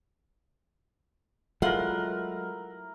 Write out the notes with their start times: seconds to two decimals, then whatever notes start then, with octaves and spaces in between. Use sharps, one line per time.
1.62 F#3 G#3 A3 E4 F4 A#4 F#5